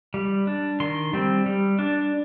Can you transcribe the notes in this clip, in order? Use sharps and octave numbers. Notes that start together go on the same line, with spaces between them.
G3
D4
D#3 C6
G3 C4
G3
D4